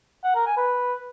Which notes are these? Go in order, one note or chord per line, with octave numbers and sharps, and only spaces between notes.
F#5
A#4
G#5
B4